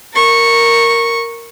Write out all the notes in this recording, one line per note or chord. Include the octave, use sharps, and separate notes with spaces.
A#4 C#6